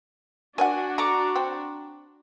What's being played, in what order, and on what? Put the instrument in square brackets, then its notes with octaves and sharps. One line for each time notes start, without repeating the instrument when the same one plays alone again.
[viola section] D4 F#4 [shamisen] A#4 D5 F#5 [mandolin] G#5
[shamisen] A4 [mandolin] A#5 C#6 D6
[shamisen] C4